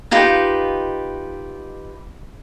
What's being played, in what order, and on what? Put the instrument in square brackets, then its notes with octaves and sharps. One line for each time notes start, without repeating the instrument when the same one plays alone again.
[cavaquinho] D#4 F4 G4 B4